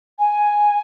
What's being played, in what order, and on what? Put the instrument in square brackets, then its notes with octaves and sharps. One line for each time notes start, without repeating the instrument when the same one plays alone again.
[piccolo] G#5